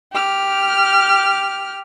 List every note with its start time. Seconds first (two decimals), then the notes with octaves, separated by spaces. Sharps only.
0.13 G4 F6